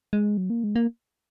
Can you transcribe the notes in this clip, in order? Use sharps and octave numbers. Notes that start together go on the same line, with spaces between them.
G#3
F#3
A#3
G#3
A#3